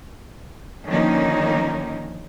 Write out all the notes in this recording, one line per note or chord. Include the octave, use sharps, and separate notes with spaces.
D3 D#3 F3 A#3 C#4 D#4